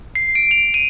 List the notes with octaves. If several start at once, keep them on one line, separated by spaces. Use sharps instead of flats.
C7
D7
F7
D#7